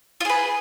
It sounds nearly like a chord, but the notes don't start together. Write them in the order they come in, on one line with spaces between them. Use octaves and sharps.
F4 G#4 B4